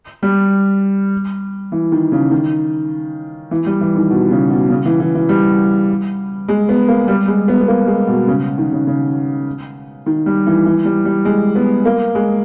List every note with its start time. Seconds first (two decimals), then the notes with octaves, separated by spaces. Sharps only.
0.23 G3
1.72 E3
1.92 D#3
2.12 C#3
2.31 D#3
3.51 E3
3.66 G3
3.81 E3
3.95 D#3
4.10 B2
4.31 C#3
4.50 B2
4.70 C#3
4.85 E3
5.00 E3
5.15 E3
5.29 G3
6.48 G#3
6.69 B3
6.88 A#3
7.08 G3
7.28 G#3
7.48 B3
7.61 B3
7.68 A#3
7.87 G#3
8.07 B2
8.27 C#3
8.58 D#3
8.72 C#3
8.87 C#3
10.06 D#3
10.26 G3
10.46 E3
10.66 E3
10.85 G3
11.05 G3
11.25 G#3
11.55 B3
11.85 A#3
12.15 G#3